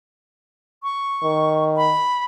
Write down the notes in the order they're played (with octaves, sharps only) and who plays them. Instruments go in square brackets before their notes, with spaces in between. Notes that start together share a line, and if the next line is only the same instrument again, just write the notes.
[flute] C#6
[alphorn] D#3
[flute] B5